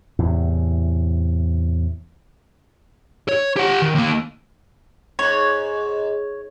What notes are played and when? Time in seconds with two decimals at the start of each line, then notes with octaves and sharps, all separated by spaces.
0.19 E2 A2 C3
3.29 C#5
3.57 G4 F#5
3.82 D#3
3.95 D#2 A#3
5.19 G#2 C#5